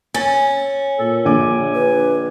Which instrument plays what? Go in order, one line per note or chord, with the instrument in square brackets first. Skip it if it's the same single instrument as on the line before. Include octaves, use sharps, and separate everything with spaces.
[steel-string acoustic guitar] C#4 [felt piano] A6
[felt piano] A#2 [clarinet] A4
[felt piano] A#1 D3 D6 [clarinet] G#5
[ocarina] B4